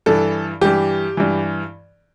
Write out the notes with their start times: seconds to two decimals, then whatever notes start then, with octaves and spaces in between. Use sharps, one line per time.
0.06 G2 E3 A4
0.61 G2 E3 G4
1.17 G2 E3